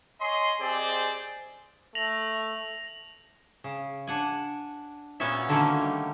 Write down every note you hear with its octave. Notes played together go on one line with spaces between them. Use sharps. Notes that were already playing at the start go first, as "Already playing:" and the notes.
C#5 D#5 G#5 C6
C4 G4 G#4 C5 D5 D#5
A3 A#6 F7 F#7
C#3
D4 F#5 G#5
A#2 B3 C#4 F#4 C#5 E5
D3 D#3 F#3 A3 A#3 C#4
G3